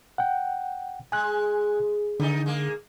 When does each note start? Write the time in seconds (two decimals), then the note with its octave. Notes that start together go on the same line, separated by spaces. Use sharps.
0.18 F#5 G5
1.12 G#3 G#5 F#6
2.20 D3 D#3 D#4
2.46 G#3 A#3